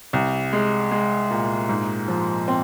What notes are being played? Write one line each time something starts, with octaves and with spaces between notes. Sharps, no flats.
C2
G#3
G#3
A#2
G#2
F3
C4